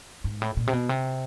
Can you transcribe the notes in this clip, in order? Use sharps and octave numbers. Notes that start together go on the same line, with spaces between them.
G#2
A2
A#2
C3
B2
C3